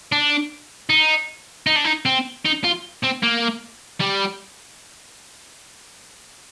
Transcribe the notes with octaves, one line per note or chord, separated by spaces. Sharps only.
D4
D#4
D#4
D4
D#4
C4
D#4
F4
C4
A#3
G3